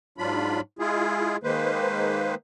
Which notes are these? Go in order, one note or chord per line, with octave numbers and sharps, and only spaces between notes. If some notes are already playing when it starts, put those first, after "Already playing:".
G#2 F#3 D4 F4 B5
G#3 E4 F4 G#4
D#3 G#3 A#3 B4 C5